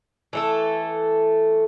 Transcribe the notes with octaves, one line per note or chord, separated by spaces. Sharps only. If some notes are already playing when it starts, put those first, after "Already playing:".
E3 A3 A4